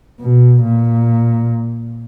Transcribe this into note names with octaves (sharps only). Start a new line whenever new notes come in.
B2
A#2